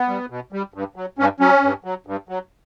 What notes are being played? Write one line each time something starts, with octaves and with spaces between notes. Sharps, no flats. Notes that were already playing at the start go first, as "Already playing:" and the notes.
Already playing: B3
G3
B2
G3
G2
F#3
G2 C#4
F#3 C#4
G2
F#3
G2
F#3